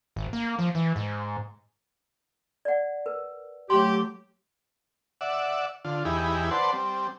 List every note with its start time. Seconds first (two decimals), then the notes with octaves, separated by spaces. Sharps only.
0.16 G#1
0.33 A#3
0.59 F3
0.75 E3
0.96 G#2
2.65 D5 F#5
3.06 A#4 B4
3.70 F#3 A3 G4 C6
5.21 D5 E5 F#5
5.85 D3 F4
6.05 E2 D#4 E4 G4 G#4 B5
6.51 B4 C5 D5 F#5 A5 C6
6.73 G3 C4